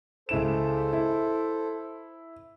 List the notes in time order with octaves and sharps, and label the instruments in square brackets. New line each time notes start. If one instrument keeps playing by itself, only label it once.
[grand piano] C#2 E4 E7 [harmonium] A4 C5
[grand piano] E4